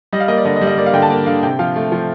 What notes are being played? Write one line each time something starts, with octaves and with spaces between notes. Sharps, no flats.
G3 D#5
F5
A#3 D#5
D5
D3 D#5
D#5
G3
D#5
A#3 D5
F5
D3 G5
A5
A#3
D3 F5
C3 G5
F3 F5
A3
F3